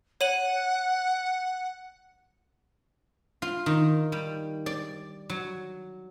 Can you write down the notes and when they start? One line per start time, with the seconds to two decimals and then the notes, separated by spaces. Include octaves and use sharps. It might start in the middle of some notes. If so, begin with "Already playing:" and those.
0.21 C#5 F#5 D#7 F#7
3.42 F4
3.66 D#3
4.12 G3
4.66 D5
5.30 F#3